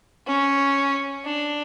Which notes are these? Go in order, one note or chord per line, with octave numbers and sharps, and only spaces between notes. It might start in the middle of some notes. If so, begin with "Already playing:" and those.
C#4
D4